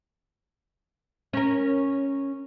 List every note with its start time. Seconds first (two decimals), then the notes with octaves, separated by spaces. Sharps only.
1.33 C#4 A#4